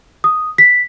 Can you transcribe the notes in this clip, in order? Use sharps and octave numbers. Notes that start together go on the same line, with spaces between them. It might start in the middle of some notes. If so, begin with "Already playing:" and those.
D#6
B6